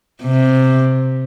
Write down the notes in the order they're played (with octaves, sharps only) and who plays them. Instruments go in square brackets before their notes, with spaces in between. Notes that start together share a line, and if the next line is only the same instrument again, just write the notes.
[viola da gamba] C3